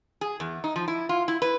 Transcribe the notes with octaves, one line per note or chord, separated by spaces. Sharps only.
G#4
E2
D#4
F3
E4
F4
E4
B4